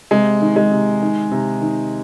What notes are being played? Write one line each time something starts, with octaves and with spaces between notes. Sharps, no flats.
C3 G#3
D#3
G#3
C3
D#3
C3
D#3